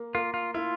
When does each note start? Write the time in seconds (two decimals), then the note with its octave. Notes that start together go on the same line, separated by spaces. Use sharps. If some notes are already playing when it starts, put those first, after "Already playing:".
Already playing: A#3
0.14 A#3 F4
0.34 F4
0.54 E4 F4